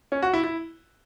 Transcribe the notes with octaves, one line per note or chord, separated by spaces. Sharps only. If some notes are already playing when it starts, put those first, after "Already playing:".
C#4
F#4
E4
E4